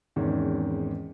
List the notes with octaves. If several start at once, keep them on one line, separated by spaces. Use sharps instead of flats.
E2 G#2 D#3 C4 C#4